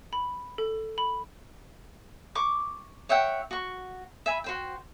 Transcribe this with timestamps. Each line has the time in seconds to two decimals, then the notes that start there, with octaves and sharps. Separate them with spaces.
0.13 B5
0.58 A4
0.98 B5
2.35 C#6 D6
3.09 C#5 E5 F#5 G5
3.51 F#4 C#6
4.26 E5 G#5 B5
4.44 F#4 C5 G5